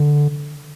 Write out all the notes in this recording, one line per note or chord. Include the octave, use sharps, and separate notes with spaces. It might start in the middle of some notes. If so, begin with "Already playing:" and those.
Already playing: D3